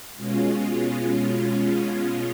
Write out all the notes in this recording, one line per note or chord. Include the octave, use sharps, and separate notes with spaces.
B2 G#3 C#4 F4